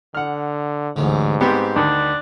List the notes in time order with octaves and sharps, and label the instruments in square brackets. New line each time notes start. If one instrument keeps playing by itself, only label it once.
[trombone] D3 [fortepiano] F#5 F6
[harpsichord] A1 D2 D3 [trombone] G#2
[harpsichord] G3 [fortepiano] B3 C4 G4
[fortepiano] D2 D3 D#3 [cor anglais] D4